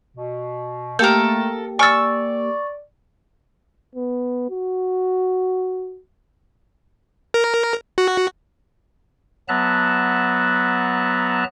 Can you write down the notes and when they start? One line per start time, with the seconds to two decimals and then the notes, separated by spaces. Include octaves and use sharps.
0.16 B2
0.99 A3 A#3 G4 A4 A#4 G6
1.79 D5 G#5 C#6 E6 F6 A6
3.95 B3
4.50 F#4
7.34 A#4
7.98 F#4
9.49 F#3 B3 E5 A5 A#5 F#6